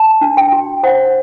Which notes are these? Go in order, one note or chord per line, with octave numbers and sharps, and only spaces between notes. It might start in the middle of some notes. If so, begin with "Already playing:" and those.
Already playing: A5
D4
G5
F#4
C5 F#5